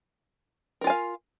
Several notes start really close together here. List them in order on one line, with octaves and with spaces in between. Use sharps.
A#4 F4 G#5 F5